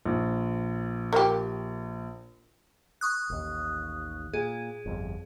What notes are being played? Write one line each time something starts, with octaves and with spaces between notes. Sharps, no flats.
A#1
A#3 G4
C#6 D#6 F#6
A1 D#2
A#2 G#4
G1 F2